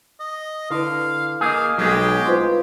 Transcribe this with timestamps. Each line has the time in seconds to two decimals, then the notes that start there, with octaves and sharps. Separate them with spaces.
0.20 D#5
0.70 D3 E4 B4 F5
1.41 A#3 G#4 D#5 F5 D6 G6
1.78 B1 F#3 G#3 G4 G#4
2.26 C2 F4 B4 C5 C6